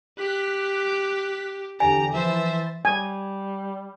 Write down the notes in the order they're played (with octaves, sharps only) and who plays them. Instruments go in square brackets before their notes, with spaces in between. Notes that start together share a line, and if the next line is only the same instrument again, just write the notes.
[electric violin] G4 [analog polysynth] F#6 B6
[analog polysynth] E2 D3 G4 [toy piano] G#5 [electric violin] A#5
[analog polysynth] E3 F3 A6 [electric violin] C5 E5
[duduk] G3 [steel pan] G#5